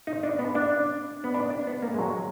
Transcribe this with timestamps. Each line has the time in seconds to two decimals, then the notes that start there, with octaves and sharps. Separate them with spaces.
0.07 D#4
0.23 D4
0.39 B3
0.55 D4
1.24 B3
1.34 D4
1.50 D4
1.67 B3
1.82 A#3
1.94 G#3
1.99 F#3